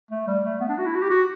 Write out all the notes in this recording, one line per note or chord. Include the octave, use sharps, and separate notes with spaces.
A3
G3
A3
B3
D4
F#4
E4
F#4
G4
F#4